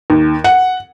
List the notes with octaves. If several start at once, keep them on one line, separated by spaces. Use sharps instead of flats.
D#2
F#5